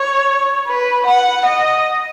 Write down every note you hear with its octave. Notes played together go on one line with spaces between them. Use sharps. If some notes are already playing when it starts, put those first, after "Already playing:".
Already playing: C#5
B4
F#5
D#5